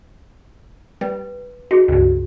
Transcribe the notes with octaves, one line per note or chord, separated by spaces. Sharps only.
G3 B4
D#4 F#4 G#4
C#2 G2